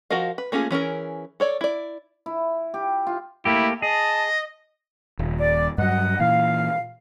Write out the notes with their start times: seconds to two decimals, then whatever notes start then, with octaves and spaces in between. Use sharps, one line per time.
0.10 F3 F#4 A#4 D#5 F5
0.38 B4
0.52 A3 A#3 C#4 F4 G#4
0.71 E3 C#4 G#4 A#4
1.40 A4 C#5 D5
1.61 E4 D5
2.26 E4
2.74 G4
3.07 F4
3.45 A3 A#3 E4 G4
3.82 G#4 D#5 A5
5.19 D#1
5.40 D5
5.78 G2 F#3 D#5 F#5
6.20 A#2 E3 F5